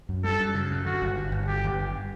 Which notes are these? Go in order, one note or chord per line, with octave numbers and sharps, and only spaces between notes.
F#2
G3 A4
F#2
C#3
F#2
D3 F#4
G1
G2
G1
D3 G4
G1
G2